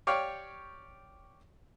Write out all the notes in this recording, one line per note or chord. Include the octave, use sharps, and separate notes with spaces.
G4 C#5 D5 F5 G5 C#6